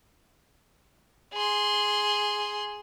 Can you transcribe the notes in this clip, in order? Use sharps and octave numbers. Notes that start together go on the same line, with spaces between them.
G#4 C6